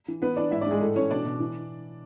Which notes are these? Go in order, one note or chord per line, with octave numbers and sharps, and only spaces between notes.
E3
E3 B3 B4
E3 D4 D5
G#2 E4 E5
D4 D5
G#2 G#3 G#4
A2 A3 A4
E3 C#4 C#5
B2 D4 D5
B2
E3